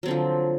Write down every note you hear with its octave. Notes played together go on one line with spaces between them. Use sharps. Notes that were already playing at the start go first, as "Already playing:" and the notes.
D3 F3 F#3 C4